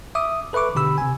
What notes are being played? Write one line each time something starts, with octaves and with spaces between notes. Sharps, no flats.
E5 D6 D#6
A4 B4 E5 C#6 D6
B2 D3 G4 B5 E6
C3 G#5